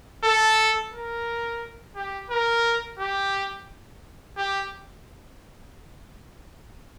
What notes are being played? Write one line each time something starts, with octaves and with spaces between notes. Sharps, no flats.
A4
A#4
G4
A#4
G4
G4